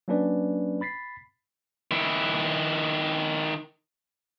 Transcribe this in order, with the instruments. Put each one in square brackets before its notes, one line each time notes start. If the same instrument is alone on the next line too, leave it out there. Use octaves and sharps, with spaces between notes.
[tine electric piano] F#3 A#3 C#4 D4 B4 D5
B5 A6 B6 C7
[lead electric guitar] D#3 E4